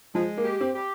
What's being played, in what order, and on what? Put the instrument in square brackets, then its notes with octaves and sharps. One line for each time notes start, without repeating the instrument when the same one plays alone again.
[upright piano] F3 [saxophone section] G#3
[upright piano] A#3
[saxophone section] G4
[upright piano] C4
[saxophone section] G4